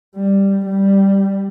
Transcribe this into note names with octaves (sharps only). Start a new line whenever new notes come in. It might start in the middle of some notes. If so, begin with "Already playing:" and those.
G3
G3